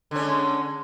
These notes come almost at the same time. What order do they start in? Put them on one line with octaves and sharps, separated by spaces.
D3 C#4 G#3